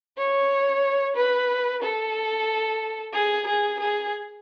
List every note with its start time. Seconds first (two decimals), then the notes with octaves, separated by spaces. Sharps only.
0.18 C#5
1.16 B4
1.83 A4
3.13 G#4
3.46 G#4
3.79 G#4